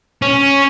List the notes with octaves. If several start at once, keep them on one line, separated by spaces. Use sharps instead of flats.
C#4